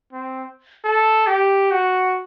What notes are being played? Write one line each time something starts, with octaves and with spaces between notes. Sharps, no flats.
C4
A4
G4
F#4